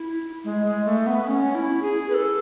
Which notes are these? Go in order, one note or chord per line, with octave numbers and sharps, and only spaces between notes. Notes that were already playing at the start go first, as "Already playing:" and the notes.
Already playing: E4
G#3
G#3
A3
B3
C#4
E4
G#4
B4
A4